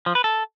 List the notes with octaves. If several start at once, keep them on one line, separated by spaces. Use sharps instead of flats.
F3
B4
A4